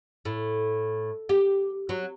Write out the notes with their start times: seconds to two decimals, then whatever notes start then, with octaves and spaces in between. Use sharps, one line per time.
0.25 A2
1.29 G4
1.89 F#3